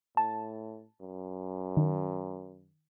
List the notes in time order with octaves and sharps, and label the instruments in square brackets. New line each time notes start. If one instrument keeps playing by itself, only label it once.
[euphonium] A2 [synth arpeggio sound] A5
[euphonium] F#2
[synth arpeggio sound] D#3